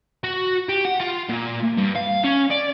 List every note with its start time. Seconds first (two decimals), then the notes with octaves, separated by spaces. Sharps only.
0.24 F#4
0.69 G4
0.85 F#5
1.00 F4
1.29 A#2
1.78 G2
1.96 F5
2.24 C#4
2.51 D5